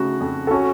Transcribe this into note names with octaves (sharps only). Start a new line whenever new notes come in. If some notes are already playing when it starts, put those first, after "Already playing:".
Already playing: C#3 A3 D#4 F#4
F2
A4
C#4 F#4